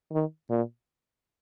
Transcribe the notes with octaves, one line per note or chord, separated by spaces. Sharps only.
D#3
A#2